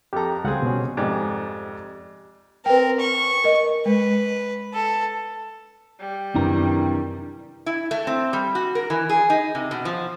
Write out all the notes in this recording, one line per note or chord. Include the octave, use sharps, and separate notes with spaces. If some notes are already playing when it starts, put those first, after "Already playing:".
F2 G4 A4 A#5
C#2 G3 C4 G#4 F5 F#5
B2 C#4
F2 G#2 G4 D5 D6
C4 A#4 B4 G5
C#6
A#4 D#5
G#3 B4
A4
G3
F#2 C3 D#3 E3 D4 E4 A#5
E4
A3
C4
G3
F#4
A#4
E3
G#4
D#4
C3
B2
F3